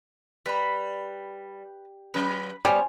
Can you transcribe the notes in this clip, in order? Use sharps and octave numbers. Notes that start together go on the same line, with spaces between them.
G3 B4 A#5 B5
F#3 C#4 B4 B5
G3 B3 C5 C#5 G#5 F6